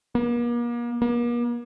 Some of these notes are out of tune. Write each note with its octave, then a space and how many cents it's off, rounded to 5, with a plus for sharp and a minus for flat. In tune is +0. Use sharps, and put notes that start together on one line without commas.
A#3 +40
A#3 +45